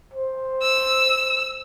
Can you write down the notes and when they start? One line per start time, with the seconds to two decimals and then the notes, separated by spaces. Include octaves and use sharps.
0.14 C5
0.62 E6